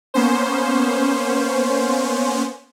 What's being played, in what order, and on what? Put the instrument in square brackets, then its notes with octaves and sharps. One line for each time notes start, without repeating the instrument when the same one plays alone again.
[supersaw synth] A#3 B3 C#4 C5